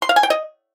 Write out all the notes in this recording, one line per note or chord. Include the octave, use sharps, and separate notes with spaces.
C6
F5
G#5
G5
D#5